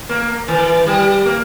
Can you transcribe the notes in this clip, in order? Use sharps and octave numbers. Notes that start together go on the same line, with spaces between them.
A#3
E3
G3
A#3